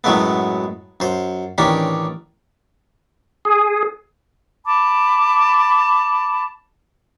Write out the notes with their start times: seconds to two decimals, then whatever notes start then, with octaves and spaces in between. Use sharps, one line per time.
0.04 F#2 A2 F#3 G#3 A3 B3
1.00 F#2 C5
1.58 A1 D#3 C#4 D4 G4
3.45 G#4
4.66 A5 B5 D6